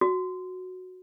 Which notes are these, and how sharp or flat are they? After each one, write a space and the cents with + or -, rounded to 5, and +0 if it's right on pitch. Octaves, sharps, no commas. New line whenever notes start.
F#4 -5